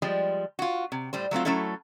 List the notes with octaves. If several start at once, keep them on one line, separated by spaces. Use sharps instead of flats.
F3 G3 G#3
F4 F#4
C3
A2 G3 C5
F#3 A3 C4 F4
F#3 A3 C#4 E4 A4